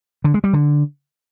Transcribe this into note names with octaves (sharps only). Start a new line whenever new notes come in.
D3
G#3
G3
D3